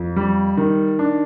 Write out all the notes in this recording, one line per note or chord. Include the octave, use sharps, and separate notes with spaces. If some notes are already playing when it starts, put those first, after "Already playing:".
Already playing: F2
G3
D#3
D4